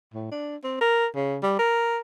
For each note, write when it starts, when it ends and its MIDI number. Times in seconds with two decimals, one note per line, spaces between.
0.14 0.27 45
0.31 0.56 62
0.64 0.76 60
0.81 1.06 70
1.16 1.37 49
1.43 1.57 55
1.59 1.99 70